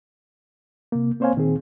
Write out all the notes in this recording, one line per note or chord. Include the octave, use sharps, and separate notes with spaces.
C3 A#3
A#3 C4 C5 C#5 F5 G#5
A#2 D#3 C4 G#4